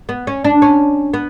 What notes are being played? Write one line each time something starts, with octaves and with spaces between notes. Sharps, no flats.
B3
C#4
D4
C#4
B3